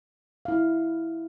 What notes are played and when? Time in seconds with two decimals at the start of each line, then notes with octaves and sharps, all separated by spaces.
0.45 E4 F5